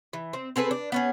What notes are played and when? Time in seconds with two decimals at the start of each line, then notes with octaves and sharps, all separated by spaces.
0.13 E3
0.33 C4
0.56 C4 G#4 A4 B4
0.71 D4
0.92 B3 C#4 G#4